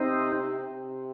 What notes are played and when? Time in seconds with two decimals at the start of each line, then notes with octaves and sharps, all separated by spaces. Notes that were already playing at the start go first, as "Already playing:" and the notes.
Already playing: C3 C4 D#4
0.59 C3